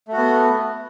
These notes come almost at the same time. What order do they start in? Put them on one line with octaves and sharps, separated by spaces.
A3 F#4 B3